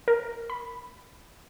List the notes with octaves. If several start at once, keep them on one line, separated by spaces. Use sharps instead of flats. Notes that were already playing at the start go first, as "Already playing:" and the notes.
A#4
B5